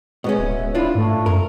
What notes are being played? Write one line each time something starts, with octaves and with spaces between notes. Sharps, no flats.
B2 G#3 B3 C#4
D1 E5
D4 E4 F4
G#2 A3
F#2 A#4